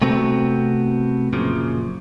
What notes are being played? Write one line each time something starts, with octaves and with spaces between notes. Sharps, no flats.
C3 A3 B3 C4 F#4
F#2 A#2 C#3 F3